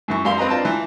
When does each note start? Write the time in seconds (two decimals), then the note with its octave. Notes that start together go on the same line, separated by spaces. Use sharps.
0.08 F#2 E3 C#6
0.25 F#2 G3 F5 C6
0.38 C4 B4 D#5 A#5
0.50 D4 F4 A5
0.65 E3